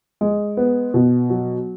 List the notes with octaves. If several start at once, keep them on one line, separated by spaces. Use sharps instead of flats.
G#3
B3
B2
F#3